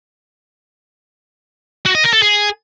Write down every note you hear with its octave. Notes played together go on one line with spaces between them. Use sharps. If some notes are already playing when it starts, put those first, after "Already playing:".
F#4
D#5
A#4
A4
G#4